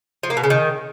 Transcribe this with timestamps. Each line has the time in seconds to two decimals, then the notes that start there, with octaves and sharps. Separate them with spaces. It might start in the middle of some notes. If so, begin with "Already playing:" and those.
0.23 F3
0.30 A#3
0.37 B2
0.44 C#3
0.50 D#3